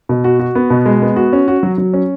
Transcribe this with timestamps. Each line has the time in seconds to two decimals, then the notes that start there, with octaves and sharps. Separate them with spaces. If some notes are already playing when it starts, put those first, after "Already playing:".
0.09 B2
0.24 F#4
0.40 F#4
0.55 B3
0.70 B2
0.86 G#3
1.02 B3
1.16 F#4
1.33 C#4
1.48 F#4
1.63 F#3
1.78 F#3
1.93 C#4